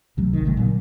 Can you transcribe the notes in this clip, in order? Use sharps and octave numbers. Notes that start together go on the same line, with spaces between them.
C#2 C3 F#3 A3
G#1 D#3
G#1 C#3 G3 A3
A#2 D3 F#3 A#3